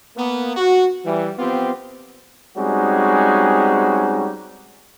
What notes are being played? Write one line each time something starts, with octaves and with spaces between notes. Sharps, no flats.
A#3 B3
F#4
E3 G3
F3 B3 C4 F4 G4
G3 G#3 C4 C#4 D#4 F#4